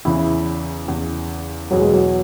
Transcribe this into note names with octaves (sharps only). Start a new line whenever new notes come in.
E2 C#3 E3 E4
E2 C#3 E3
E2 B2 F#3 B3 G#4 B4
G#3
F#3